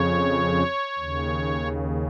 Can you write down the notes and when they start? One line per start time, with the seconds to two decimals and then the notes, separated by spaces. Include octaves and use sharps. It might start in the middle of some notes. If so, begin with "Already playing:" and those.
Already playing: F2 C#3 C#5
0.98 D#2 C#3